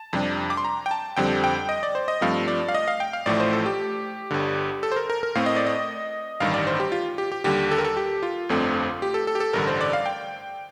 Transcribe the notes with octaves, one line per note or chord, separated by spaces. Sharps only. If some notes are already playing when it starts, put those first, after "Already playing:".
Already playing: A5
F2 C3 G3 D4
D6
C6
A#5
G5
A5
F2 D3 G3 C4 G5
G5
D#5
D5
C5
D#5
G2 F3 A3 C4 F5
D5
F5
D#5
F5
G5
F5
A1 A2 F3 A3 D5
C5
A4
G4
G1 G2 D3
A4
C5
A#4
A#4
A#4
A2 A3 C4 F5
D#5
D5
D#5
A1 G2 D#3 G3 F5
D5
C5
G4
F4
G4
G4
D#2 D3 G3 G4
A4
A#4
A4
G4
F4
G1 F2 D3 A3 C4
G4
A4
A4
G4
A4
A1 G2 D3 A#4
C5
D5
F5
G5